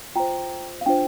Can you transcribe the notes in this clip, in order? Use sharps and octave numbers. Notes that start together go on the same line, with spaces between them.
F4 C5 G5 A#5
F5
D4 F4 C5 G5